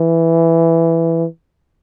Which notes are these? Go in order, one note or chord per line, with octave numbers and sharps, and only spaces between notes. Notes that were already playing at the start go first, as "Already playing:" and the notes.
Already playing: E3